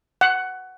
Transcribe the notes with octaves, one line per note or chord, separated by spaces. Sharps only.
F#5